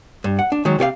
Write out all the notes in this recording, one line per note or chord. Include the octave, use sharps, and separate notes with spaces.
G2
F#5
D4
D#3 F#3 G#3
C3 G4 C#5 F5